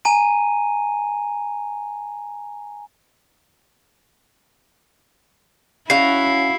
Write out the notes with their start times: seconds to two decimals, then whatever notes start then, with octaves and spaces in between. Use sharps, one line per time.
0.05 G#5 A#5 D#7
5.90 C#4 E4 F#4 F5 C7